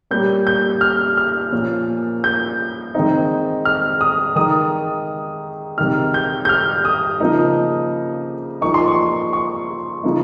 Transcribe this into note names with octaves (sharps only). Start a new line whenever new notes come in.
A#2 G3 A#3 C#4 G6
G6
F6
F6
A#2 F3 A#3 C#4
G6
D#3 G#3 C4 D#4
F6
D#6
D#3 G#3 D#4 D#6
C3 D#3 G#3 D#4 F6
G6
G6
F6
D#6
C#3 F3 A#3 D#4
F3 A#3 D#4 C#6
C6
C#6
C#6
C#3 F3 A#3 D#4